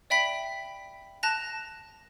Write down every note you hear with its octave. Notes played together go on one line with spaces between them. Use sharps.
D5 E5 G5 B5 B6
A5 F#6 A#6 F7